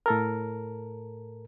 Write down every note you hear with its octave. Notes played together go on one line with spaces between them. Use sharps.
A2 A4 A#4